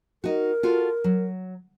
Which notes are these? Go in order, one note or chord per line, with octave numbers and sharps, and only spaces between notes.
D#4 F#4 A#4
F4 F#4 A4
F#3